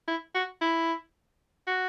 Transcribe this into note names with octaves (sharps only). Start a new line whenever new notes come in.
E4
F#4
E4
F#4